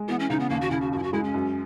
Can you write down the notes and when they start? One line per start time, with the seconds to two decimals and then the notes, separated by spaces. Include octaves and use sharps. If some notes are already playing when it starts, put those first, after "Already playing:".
Already playing: G#3
0.08 E3 B3
0.20 C#4
0.30 C#3 D#4
0.40 B3
0.50 D#2 A#3
0.61 F#4
0.71 C#3 E4
0.81 F#4
0.92 F#2 F#4
0.98 E4
1.03 F#4
1.13 G#3 E4
1.24 C#4
1.34 F#2